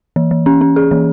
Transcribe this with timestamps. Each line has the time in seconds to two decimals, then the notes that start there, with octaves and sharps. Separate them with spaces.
0.16 E3
0.31 E3
0.46 C#4
0.61 C#4
0.76 G#4
0.91 E3